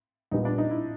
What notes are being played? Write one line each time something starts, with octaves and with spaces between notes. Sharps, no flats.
A#1 A#2 G3 B3 D#4
D4
D#4
E4